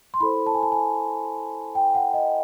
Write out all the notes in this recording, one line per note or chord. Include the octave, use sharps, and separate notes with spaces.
C6
E4 A4 C5 B5
A5
G#5
A5
G#5
G5
F#5
D#5